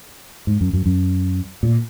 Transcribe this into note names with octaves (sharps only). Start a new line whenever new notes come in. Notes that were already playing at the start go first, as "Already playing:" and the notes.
G#2
F#2
F#2
F#2
A#2